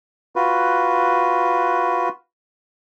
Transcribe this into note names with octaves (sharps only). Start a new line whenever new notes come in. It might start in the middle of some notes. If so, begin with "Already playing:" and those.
F4 F#4 B4